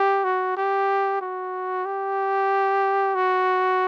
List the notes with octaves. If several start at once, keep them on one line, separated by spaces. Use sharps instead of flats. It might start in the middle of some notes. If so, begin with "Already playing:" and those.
Already playing: G4
F#4
G4
F#4
G4
F#4